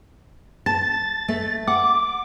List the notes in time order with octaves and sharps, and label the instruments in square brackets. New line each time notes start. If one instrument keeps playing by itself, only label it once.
[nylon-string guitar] A5 [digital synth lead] A6
[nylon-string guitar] A3
[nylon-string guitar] F#5 [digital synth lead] D6